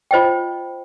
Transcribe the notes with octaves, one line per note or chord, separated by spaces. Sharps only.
F4 C5 D#5 G5